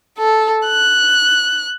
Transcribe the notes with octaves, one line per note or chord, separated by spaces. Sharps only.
A4
F#6